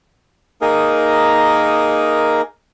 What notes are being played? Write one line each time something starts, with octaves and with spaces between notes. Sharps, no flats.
A#3 D#4 G#4 A#4